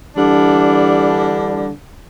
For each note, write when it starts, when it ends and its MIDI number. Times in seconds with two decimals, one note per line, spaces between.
0.17 1.70 50
0.17 1.70 52
0.17 1.70 55
0.17 1.70 62